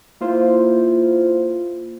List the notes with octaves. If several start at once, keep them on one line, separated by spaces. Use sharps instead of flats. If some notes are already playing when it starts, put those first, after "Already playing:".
A#3 E4 F4 C5